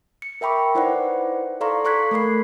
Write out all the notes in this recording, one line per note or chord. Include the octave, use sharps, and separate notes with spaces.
C#7
A#4 E5 G5 B5 C#6 D6
D#4 E4 B4 C5 D5 F#5
A4 D5 F5 A#5 C6 C#6
A4 C6 C#6 F#6 G#6 B6
A3 A4 A#4 B5 C7